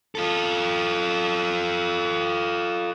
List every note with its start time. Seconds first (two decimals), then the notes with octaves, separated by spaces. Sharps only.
0.15 F4 A4